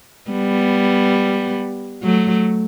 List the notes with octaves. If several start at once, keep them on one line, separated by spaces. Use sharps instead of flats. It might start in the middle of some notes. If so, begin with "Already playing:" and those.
G3 B3
F#3 A3